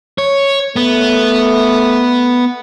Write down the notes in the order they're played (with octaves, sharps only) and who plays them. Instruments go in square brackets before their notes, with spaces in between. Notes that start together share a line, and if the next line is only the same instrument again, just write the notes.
[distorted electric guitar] C#5
[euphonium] A3 [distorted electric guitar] B3